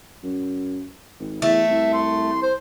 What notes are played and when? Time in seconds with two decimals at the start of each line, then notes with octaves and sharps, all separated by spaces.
0.23 F#2
1.20 G#1
1.42 E2 A3 E5
1.70 C2
1.93 C6
2.42 C5